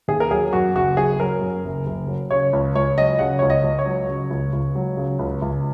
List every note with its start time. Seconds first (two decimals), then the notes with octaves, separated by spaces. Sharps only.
0.08 D#2 G#4
0.20 A#4
0.31 F#3 G#4
0.53 F#2 F#4
0.75 F#1 F#4
0.97 F#1 G#4
1.20 F#3 A#4
1.41 F#2
1.64 F#1
1.86 F#1
2.08 F#3
2.31 C#3 C#5
2.53 C#2
2.75 C#2 C#5
2.97 F#3 D#5
3.19 C#3 F#5
3.39 C#2 C#5
3.50 D#5
3.64 C#2
3.79 C#5
3.86 F#3
4.09 C#3
4.30 C#2
4.53 C#2
4.76 F#3
4.97 C#3
5.19 C#2
5.42 C#2